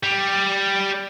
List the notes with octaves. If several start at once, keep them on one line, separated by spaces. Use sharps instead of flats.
G3